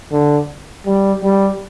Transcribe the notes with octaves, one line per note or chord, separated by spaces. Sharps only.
D3
G3
G3